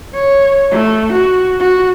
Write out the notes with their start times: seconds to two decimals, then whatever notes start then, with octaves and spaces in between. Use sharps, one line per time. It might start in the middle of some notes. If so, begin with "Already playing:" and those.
0.14 C#5
0.71 A3
1.12 F#4
1.59 F#4